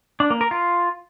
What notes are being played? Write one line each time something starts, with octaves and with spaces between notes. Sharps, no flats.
D4
A#3
A#4
F4